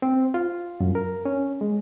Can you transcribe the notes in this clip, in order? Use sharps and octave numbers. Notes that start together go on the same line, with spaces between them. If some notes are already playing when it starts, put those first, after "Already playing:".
C4
F4
F#2
A#4
C#4
G#3